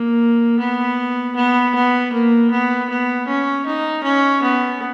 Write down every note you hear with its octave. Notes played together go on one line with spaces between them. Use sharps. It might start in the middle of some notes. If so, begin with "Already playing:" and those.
Already playing: A#3
B3
B3
B3
A#3
B3
B3
C#4
D#4
C#4
B3